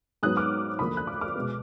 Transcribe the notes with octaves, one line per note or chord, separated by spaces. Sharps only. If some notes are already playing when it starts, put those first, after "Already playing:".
G#2 F#3 B3 D#6 F#6
D6 F6
D2 D3 F3 A#3 B5 D#6
F#6
D6 F6
D6 F6
B2 G#3 B3